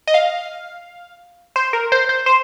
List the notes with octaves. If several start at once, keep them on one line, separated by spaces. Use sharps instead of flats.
D#5
F5
C5
A#4
C5
C5
C5